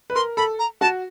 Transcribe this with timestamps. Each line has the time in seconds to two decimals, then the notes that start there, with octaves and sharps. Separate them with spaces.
0.10 B4
0.15 A#4 C6
0.37 A4 B5
0.59 A#5
0.81 F#4 A5